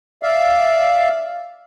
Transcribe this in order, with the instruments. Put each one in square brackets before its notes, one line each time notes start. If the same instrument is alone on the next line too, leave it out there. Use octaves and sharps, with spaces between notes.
[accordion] D5 E5 F5